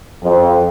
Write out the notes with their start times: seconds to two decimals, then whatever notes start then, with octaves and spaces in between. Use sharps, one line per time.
0.22 F2